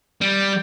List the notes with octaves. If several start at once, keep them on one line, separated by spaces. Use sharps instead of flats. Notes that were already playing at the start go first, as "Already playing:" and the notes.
G3